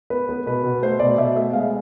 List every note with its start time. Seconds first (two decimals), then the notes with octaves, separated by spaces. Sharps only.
0.10 B3 B4
0.29 B3
0.46 B2 B4
0.64 B2
0.82 A3 C5
1.00 B2 D5
1.17 B2 E5
1.36 A3 E5
1.53 G#3 F5